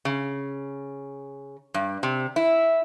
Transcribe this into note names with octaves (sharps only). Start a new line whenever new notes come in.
C#3
G2
C3
E4